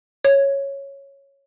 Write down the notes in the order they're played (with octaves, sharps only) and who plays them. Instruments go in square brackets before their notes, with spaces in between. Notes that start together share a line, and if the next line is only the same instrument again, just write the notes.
[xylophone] C#5